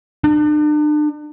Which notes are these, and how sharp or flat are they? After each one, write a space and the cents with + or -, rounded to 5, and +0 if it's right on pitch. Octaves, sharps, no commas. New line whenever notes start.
D4 +40